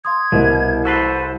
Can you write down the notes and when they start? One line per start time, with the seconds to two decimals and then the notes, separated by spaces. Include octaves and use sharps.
0.05 F5 C6 D#6 G#6
0.32 C2 B2 A#4 C5 D#5
0.85 F#4 A4 B4 C5 E6 B6 C7